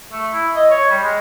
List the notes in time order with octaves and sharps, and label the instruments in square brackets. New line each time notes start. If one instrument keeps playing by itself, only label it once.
[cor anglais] A3
E4
D#5
C#5
G3
G#3